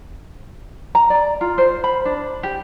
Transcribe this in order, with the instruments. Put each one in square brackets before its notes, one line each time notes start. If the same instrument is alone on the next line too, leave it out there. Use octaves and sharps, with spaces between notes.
[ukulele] A#5
D5
F4
C5
B5
D4
G4